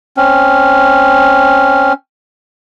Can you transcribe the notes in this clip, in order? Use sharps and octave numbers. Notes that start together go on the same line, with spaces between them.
C4 C#4